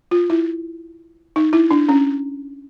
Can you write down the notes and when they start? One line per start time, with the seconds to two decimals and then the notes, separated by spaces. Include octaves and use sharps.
0.11 F4
0.30 E4
1.36 D#4
1.53 E4
1.71 D4
1.89 C#4